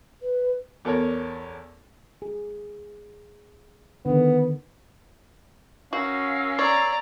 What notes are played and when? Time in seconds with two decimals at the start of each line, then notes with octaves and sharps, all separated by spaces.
0.22 B4
0.85 E2 A4 A#4 C#5
2.22 G#4
4.06 D3 D#3 B3
5.93 C#4 F#4 A#4 F5 E6
6.59 C#5 D5 A#5